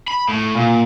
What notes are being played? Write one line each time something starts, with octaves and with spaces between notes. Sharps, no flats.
B5
A2
A#2